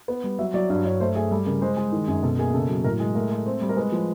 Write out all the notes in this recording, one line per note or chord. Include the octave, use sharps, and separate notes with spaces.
B3
G3
F#3 E5
F#3 D5
G2 D5
G2 C#5
A3 C5
A3 G#4
G3 A4
C#3 A#4
G#3 C5
G#3
D#3
F#2 G#4
B2 A4
A#3 G#4
C#3 A4
F#3
A2 A#4
G#3
A3 A#4
A3
C4
G3
A#4
G#3 B4
F3